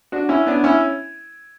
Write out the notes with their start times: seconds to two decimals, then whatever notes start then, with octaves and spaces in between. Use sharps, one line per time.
0.12 D4 F#4
0.29 C#4 E4
0.46 B3 D4
0.64 C#4 E4